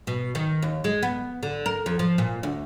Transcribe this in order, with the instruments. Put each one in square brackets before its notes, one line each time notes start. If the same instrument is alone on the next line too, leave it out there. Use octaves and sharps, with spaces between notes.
[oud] B2
D#3
D#2
G#3
B3
D3
A#4
F2
F3
A#2
D2